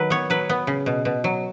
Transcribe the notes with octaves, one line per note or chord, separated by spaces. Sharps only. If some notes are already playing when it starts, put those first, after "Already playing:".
Already playing: D#3 F#3 B4
B3 C#5
F#3 B4
B3
C#3
B2
B2
F#3